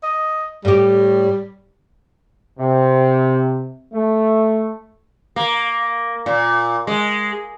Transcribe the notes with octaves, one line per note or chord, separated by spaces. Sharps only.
D#5
A2 G3 G4
C3
A3
A#3
A#2
G#3